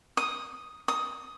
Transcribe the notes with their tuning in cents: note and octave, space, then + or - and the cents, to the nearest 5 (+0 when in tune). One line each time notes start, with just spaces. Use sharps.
D#6 +5
D#6 +15